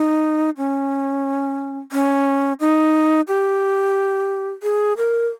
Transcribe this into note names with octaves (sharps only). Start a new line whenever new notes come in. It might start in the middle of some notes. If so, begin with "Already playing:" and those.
Already playing: D#4
C#4
C#4
D#4
G4
G#4
A#4